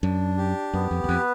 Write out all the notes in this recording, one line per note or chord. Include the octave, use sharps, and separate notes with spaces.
F#2 D4
G4
F#2 B3
F2
E2
F2 B4